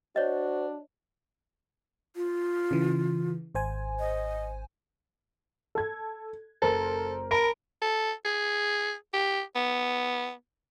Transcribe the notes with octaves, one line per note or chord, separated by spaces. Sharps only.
D4 F#4 C5 C#5 D#5
F4
C#3 E3
G#1 C5 G#5
D#5
A4 G#6
F#1 A4 A#4 C5
A#4 A5 B5 D7
A4
G#4
G4
B3